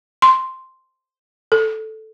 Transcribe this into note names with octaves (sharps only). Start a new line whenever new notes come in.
C6
A4